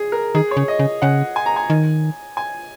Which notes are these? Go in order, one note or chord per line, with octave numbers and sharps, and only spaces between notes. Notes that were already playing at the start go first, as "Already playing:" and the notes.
Already playing: G#4
A#4
D#3 G#4
C#5
C#3
D#5
C#3
C#3 F#5
G#5
A#5
G#5
D#3
G#5